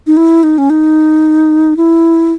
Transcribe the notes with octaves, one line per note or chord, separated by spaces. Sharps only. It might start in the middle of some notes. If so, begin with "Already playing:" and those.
D#4
E4
D#4
C#4
D#4
E4